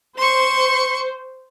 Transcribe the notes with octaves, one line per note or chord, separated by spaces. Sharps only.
C5 C6 C#6